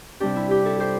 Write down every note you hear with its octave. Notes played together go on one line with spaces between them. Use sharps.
C3 G3 D4 G4
E4
G4
E4 A4
G4 C5